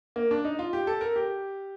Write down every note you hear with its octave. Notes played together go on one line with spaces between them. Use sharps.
A#3
D4
D#4
F4
G4
A4
A#4
G4